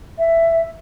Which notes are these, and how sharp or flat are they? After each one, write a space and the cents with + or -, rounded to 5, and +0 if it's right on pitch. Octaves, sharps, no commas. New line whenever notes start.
E5 +10